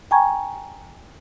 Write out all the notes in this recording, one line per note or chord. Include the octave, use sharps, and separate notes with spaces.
G5 G#5 A#5 C#6 G#6